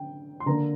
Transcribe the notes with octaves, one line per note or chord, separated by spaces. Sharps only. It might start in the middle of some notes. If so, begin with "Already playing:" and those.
Already playing: D3 G5
C6
D3 A#3 D4 A#5